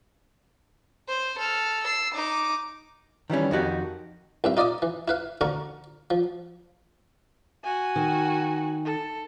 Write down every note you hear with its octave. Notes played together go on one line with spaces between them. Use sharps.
C5
A4 F6
E6 C7
D#4 D6
D#3 E3 G3 C#4
F2 D#3 F#4 G4
C2 G2 E5
D#4 F4 D5 D#5 D6 D#6
E3
E4 B4 F5
D2 D3 F5 A#5 C#6
F3
F#4 G#5
D#3
A4